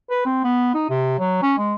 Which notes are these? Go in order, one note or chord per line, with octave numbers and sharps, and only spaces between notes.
B4
C4
B3
D#4
C3
F#3
C#4
G#3